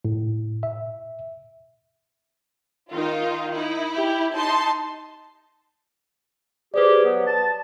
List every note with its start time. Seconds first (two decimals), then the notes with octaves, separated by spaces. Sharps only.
0.05 A2
0.63 E5
2.92 D#3 D#4 F4
3.54 D#4 E4
3.95 G4
4.37 D#4 A5 C6
6.74 G4 G#4 B4 C5 D5
7.04 F#3 B3
7.26 A5